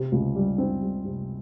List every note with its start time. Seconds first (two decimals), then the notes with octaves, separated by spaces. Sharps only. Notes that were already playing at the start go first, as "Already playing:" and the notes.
Already playing: C3
0.12 C#2
0.35 G3
0.58 C4
0.81 G3
1.05 C3